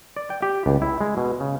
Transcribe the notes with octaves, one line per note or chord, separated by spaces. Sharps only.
D5
G5
G4
C#2
E4
G#3
B2
C#3